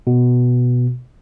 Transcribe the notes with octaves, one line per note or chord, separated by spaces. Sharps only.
B2